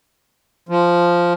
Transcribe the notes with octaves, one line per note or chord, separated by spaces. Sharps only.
F3